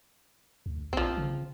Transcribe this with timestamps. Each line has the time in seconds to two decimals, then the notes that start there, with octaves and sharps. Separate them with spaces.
0.66 D2
0.93 A#1 F3 C4
1.17 C#3